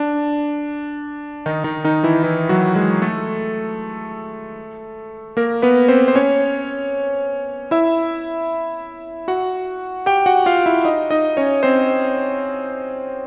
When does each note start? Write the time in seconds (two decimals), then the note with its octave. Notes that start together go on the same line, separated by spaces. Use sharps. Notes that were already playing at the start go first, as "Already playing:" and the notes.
Already playing: D4
1.46 D#3 D#4
1.64 D#3 D#4
1.84 D#3 D#4
2.04 E3 E4
2.24 E3 E4
2.49 F#3 F#4
2.75 G#3 G#4
3.02 A3 A4
5.37 A#3 A#4
5.62 B3 B4
5.88 C4 C5
6.08 C5
6.15 C#4 C#5
7.71 E4 E5
9.28 F#4 F#5
10.06 G4 G5
10.26 F#4 F#5
10.46 F4 F5
10.66 E4 E5
10.85 D#4 D#5
11.11 D#4 D#5
11.37 C#4 C#5
11.63 C4 C5